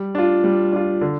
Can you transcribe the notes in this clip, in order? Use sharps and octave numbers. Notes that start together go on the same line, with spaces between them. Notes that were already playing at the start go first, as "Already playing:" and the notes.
Already playing: G3
D4 F4
G3
D4 F4
D3